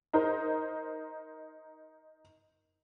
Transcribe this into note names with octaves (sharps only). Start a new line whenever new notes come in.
D#4 A#4 C5